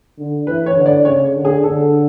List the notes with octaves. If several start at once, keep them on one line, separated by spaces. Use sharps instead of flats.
D3
E3 B4
C#5
D3
D5
C#3 C#5
D3
G#4
D3 A4